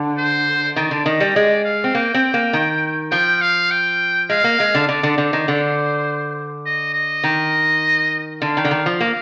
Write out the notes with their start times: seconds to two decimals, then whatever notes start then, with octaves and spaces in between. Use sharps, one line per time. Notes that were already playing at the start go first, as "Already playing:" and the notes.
Already playing: D3
0.18 C5
0.76 D#3 D5
0.91 D3
1.06 D#3 D#5
1.20 G3
1.36 G#3 D5
1.65 F5
1.84 C4
1.95 A#3 G5
2.14 C4
2.34 A#3
2.53 D#3
3.12 F3 G5
3.42 F5
3.71 G5
4.30 G#3 F5
4.44 A#3
4.60 G#3
4.75 D3
4.88 D3 D5
5.03 D3
5.18 D3 C5
5.33 D#3
5.48 D3
6.66 D#5
6.94 D#5
7.24 D#3
8.42 D3 F5
8.57 D#3
8.65 D3
8.71 D#3
8.86 F3
9.00 A#3